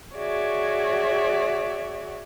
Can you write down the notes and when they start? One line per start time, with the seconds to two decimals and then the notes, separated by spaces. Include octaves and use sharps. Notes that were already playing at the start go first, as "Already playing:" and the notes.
0.14 F#4 G#4 C#5 D5 E5